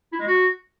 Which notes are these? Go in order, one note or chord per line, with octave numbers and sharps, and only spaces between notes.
E4
G#3
F#4